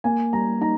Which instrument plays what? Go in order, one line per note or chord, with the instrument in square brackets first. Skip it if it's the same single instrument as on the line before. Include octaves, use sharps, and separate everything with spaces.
[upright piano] A#3 G#5
G3 A#5
D#4 A#5